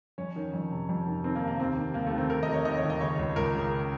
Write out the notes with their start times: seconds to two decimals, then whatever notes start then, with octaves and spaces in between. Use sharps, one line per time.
0.18 F2 C#4
0.36 D#3
0.54 F2
0.71 C3
0.89 F2
1.07 D#3
1.24 D#3 C4
1.35 A#3
1.42 C3
1.47 A#3
1.60 D#2 C4
1.77 D#3
1.94 D#2 A#3
2.07 A3
2.13 D#2
2.18 C4
2.30 D#3 A#4
2.43 D#5
2.48 D#2
2.54 C#5
2.65 D#2 D#5
2.78 C#5
2.84 D#2
2.90 D#5
3.01 C#3 C#5
3.19 C#2
3.36 C#2 A#4
3.55 C#3